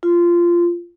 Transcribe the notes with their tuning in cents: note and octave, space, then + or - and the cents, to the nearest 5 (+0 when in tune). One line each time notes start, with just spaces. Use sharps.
F4 -15